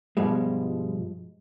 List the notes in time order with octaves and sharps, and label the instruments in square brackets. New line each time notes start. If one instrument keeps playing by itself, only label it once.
[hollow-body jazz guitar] G2 B2 F3 G3 G#3